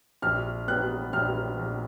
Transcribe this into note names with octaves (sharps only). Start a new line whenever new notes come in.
A#1 F6
B3 F#6
A#1 F6
A#1